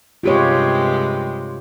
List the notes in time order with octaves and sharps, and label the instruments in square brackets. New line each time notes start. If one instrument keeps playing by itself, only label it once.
[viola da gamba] G2 C3 G#3 [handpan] F4 G4 C#5